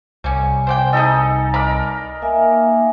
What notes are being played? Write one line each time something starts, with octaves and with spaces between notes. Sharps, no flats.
C2 G3 C#4 G#5
C5 D5 G5
D#4 G#4 A4 D#5
A#4 D5 D#5 A#5 B5
A#3 E5 G#5